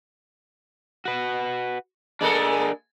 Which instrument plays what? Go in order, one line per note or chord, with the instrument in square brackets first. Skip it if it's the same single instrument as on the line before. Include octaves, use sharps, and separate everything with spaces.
[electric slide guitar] F#4 B4
[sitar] G#3 A#3 A4 [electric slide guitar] D4 A#4